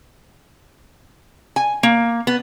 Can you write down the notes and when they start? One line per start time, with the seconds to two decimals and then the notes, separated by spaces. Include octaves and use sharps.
1.56 G#5
1.83 A#3
2.27 B3